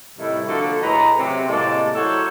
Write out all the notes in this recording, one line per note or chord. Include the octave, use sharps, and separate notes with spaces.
A2 C3 D#3 G3 A3 E4
D3 F3 A#3 F#4 A4
A2 G#4 B4 D#5 A#5
C3 F#3
A2 C3 G#3 A#3 D5 A5
F#3 E4 F#4 A4 C5 C#5